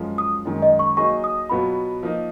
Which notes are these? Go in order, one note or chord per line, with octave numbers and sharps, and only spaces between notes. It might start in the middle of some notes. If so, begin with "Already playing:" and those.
Already playing: F#2 F3 G#3
D#6
F#2 D#3 G#3
D#5
C#6
F#3 A#3 D#4 G#4 D#5 C#6
D#6
B2 F#3 B3 F4 B5
F3 A#3 D#4